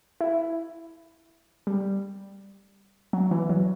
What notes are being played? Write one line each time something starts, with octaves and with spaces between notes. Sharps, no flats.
E4
G3
F#3
E3
F#3